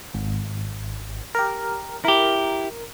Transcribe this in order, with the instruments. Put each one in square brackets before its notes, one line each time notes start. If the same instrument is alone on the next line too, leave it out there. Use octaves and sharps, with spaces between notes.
[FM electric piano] G#1
G4 A#4
[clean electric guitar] E4 G4 [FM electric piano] A#4